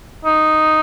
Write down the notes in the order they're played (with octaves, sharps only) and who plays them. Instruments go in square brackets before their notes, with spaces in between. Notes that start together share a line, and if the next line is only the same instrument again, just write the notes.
[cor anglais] D#4